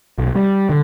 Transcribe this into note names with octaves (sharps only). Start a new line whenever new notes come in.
B1
G3
D3